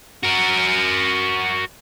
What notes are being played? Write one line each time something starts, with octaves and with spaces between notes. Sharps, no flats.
F#4 A#4